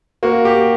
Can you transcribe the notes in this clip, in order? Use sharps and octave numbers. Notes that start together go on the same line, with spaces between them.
A#3 F#4
G4